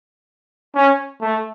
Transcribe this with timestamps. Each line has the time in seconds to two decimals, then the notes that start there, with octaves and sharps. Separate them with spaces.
0.75 C#4
1.21 A3